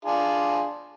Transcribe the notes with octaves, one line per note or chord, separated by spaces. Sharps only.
D4 F4 G#4